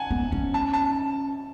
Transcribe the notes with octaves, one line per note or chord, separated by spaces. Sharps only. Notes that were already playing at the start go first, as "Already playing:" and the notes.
Already playing: F#5 G#5 A5
B3
C#4
A5
A5